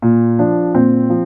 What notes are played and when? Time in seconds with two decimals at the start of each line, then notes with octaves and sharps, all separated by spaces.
0.02 A#2
0.39 F3 D4
0.74 A#2 C4
1.10 F3